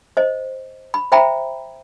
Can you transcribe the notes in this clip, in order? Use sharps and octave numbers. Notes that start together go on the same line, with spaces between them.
C5 D#5
B5
C5 E5 G5 A#5 B5